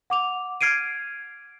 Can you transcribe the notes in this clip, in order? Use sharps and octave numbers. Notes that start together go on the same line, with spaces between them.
F#5 D6 F7
F6 G#6 C7 D7 D#7